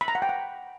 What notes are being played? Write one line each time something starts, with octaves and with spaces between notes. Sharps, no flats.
B5
A#5
F#5
G5
F#5